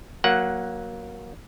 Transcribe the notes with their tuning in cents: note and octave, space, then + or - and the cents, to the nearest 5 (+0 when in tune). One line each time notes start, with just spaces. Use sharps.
F#3 +0 A#3 +15 F#5 +0